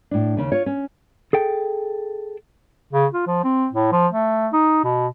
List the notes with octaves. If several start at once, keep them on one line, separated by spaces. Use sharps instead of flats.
A2 D4
D#2 C#3
F4 C#5
C#4
G#4 A4 G5
C#3
F4
F3
C4
A2
F3
A3
D#4
B2